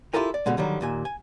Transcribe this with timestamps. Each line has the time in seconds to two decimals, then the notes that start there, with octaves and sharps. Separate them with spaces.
0.14 E4 F4 G4 A4 A#4 G#5
0.34 D5
0.46 B2 D3 G#3
0.57 D3 D#3 F#3 G3
0.81 D#2 A#2 G#5
1.05 G#5